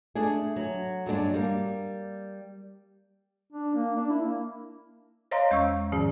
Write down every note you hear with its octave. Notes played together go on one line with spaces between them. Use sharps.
A3 D4 G#4
F#3
G2 F#3 G#3 B3 D4
G3 A#3
D4
A#3
D4
E4
A#3
C5 C#5 D#5 F5 A#5 C6
E2 G#3 C#4 F5 C#6 E6
G#2 D#3 F3 C#4 G#4